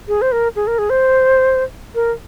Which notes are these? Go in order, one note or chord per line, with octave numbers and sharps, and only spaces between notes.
G#4
C5
A#4
G#4
A#4
G#4
C5
A#4